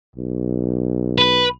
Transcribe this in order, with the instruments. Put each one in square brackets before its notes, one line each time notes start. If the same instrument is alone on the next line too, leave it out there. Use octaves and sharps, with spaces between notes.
[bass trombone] B1
[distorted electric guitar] B4